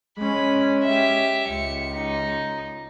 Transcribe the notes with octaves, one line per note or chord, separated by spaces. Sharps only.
G#3 C#4 B5
G4 E5
C#2 C#7
D#4